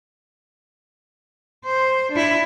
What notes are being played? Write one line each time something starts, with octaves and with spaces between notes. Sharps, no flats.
C5
D4 E4